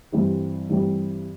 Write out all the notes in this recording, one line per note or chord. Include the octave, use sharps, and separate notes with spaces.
G2 E3 G3 C4 G4
G2 E3 G3 C4 G4